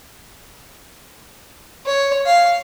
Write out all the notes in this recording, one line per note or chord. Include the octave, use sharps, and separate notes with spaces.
C#5
F5